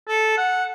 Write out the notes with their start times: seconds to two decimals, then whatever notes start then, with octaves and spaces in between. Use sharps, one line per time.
0.08 A4
0.37 F#5